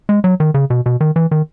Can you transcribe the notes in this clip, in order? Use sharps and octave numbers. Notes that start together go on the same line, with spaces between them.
G#3
F#3
D#3
C#3
B2
B2
D#3
E3
D#3